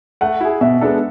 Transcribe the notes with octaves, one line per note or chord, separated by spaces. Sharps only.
A3 F#5
E4 G#4
B2 E5
G#3 B3 D4 A4